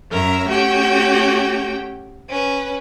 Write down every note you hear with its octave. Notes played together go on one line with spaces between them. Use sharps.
F#2 C#4 A#4 E5 A#5
A3 C#4 F#4 G4 G5
C#4 B4